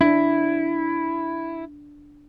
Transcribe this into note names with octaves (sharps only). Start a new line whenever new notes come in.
D4 E4